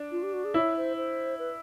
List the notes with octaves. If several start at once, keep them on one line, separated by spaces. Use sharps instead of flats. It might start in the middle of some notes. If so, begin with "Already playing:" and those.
Already playing: D4
F4
G4
F#4
G#4
E4 C#5
C5
C5
B4